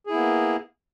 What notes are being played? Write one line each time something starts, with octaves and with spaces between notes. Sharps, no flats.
A#3 B3 E4 G#4